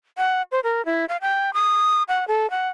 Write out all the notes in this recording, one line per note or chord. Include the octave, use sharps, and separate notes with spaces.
F#5
C5
A#4
E4
F5
G5
D#6
F#5
A4
F#5